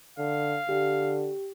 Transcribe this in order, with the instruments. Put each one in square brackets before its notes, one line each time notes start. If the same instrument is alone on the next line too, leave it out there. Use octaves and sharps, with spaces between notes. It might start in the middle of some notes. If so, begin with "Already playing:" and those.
[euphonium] D3 [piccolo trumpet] F5
[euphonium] D3 [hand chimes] G4